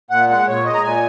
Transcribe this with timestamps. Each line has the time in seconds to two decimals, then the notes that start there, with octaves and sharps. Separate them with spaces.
0.10 A#2 F#5
0.29 G#3 F#5
0.46 A#2 C#5
0.64 G#3 D#5
0.74 A#5
0.82 A#2 G#5